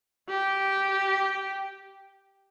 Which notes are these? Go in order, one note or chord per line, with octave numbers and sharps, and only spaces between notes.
G4